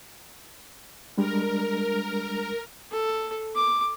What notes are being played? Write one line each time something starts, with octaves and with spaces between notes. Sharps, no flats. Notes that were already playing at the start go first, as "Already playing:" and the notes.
G3 G#3 D4 A#4
A4
D6